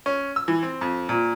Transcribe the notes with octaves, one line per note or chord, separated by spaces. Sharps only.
C#4
E6
E3
C4
F2
A#2